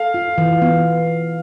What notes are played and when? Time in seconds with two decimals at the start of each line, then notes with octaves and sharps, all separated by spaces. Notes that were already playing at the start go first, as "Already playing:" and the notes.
Already playing: A4 F5
0.14 F4
0.38 E3
0.62 B3